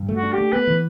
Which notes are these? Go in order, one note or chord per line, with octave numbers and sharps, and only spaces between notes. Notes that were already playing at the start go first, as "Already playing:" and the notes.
Already playing: G2
A3 F#4
D4
G4
A3
B3 B4
E3